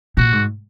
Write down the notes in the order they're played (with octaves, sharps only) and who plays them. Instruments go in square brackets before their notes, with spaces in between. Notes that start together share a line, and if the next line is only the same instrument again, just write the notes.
[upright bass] A#2 [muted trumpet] F#4
[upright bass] G#2